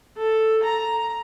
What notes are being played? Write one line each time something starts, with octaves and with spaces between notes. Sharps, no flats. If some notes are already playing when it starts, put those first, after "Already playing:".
A4
A#5